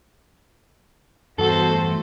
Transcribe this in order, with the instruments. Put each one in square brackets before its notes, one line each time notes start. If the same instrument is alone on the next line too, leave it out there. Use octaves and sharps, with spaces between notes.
[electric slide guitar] E2 G2 E3 [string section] B3 F#4 C5 [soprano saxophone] A4
[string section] A3